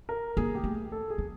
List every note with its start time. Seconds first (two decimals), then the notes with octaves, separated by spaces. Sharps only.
0.09 A#4
0.37 A#3 G#4
0.55 G4
0.64 A3
0.92 A4
1.10 G#4
1.18 C4